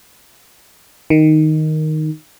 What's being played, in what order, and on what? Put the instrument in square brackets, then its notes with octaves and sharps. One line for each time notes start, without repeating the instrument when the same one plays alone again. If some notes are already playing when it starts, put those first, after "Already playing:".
[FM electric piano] D#3